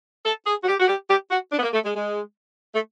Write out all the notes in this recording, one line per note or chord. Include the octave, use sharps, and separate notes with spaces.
A4
G#4
F#4
G4
F#4
G4
G4
F#4
D4
B3
A#3
A3
G#3
G#3
A3